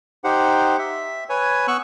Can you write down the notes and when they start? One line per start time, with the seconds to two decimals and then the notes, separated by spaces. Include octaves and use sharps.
0.24 D#4 G4 C5 F#5
0.79 E5
1.29 B4 C#5 G#5
1.68 B3 C#6 E6 F#6